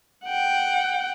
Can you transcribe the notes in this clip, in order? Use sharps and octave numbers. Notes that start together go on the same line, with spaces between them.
F#5 G5